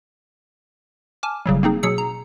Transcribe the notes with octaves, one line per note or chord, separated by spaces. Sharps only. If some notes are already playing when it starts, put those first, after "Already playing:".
G#5 A5 D6 F6
G1 C#3 F#3 G3
A#3 C4 D#4 G#4
B2 F#3 G#4 E6 C#7
A#5